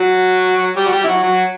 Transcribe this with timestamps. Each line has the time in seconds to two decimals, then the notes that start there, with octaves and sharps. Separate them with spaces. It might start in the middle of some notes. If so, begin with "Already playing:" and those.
Already playing: F#3 F#4
0.76 G3 G4
0.86 F#4
0.92 G3 G4
1.04 E4
1.08 F#3 F#4
1.23 F#3 F#4